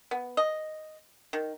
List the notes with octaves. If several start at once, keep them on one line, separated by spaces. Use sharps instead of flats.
B3
D#5
D#3